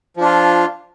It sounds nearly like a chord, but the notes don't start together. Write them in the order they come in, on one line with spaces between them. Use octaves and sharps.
F3 D4 F4